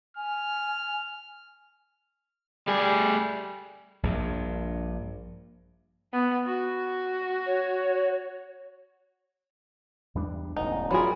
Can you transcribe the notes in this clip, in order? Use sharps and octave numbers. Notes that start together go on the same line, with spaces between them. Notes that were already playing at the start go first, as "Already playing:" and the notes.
G#5 F6
G3 A3 G#4 G#5
A#1 G2 A#2
B3
F#4
C#5
E2 G3 D4
E1 A1 D2 D#4
F#3 G3 F4 G#4 A#4 B5